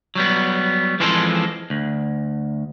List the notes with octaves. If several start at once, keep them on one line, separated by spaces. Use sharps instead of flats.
F#3 G3 B3
E3 F3 G#3 C4 A4 C5
D2